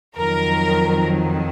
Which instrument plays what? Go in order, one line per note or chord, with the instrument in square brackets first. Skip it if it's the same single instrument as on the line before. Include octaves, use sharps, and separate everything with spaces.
[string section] F2 D#3 F#3 A#4